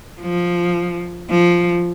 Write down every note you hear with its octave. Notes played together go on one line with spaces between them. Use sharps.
F3
F3